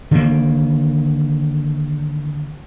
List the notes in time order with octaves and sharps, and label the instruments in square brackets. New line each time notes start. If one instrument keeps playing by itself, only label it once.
[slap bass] D3 D#3 A#3